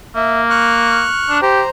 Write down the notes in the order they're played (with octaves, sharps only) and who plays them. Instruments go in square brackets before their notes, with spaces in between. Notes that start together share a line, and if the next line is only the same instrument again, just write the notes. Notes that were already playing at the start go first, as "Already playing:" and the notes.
[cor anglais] A#3 [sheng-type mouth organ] E5
[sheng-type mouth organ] C#6 F6 F#6
[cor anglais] D4
[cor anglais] G4 [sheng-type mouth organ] C5 A#5